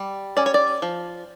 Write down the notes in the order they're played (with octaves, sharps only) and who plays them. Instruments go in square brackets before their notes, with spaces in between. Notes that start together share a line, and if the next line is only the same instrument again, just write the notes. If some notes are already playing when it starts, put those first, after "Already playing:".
Already playing: [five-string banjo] G3
C#4 D5
C#5
D5
F3